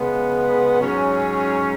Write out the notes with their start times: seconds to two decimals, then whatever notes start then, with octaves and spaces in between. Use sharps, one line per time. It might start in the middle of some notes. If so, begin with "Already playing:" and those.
Already playing: C#3 G#3 B3
0.79 G#2 F#3 C#4